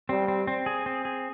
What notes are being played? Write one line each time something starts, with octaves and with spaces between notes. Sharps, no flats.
G3 C4
C4
C4
G#4
C4
G#4